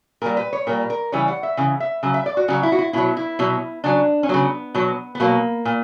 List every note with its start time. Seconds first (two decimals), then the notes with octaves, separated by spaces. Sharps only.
0.22 A#2 G3 A#4
0.37 B4
0.53 C#5
0.67 A#2 G3 A#4
0.90 A#4
1.12 C#3 E3 G3 C#5
1.28 F#5
1.43 E5
1.57 C#3 E3
1.80 E5
2.03 C#3 F#3
2.14 E5
2.26 D5
2.37 F#4
2.48 C#3 F#3 F#4
2.63 E4
2.72 F#4
2.79 E4
2.93 B2 F#3 E4
3.17 E4
3.39 B2 F#3
3.84 C#3 F#3 D4
4.23 C#4
4.29 C#3 F#3 B3
4.75 B2 F#3
5.15 B3
5.20 B2 F#3 A#3
5.65 A#2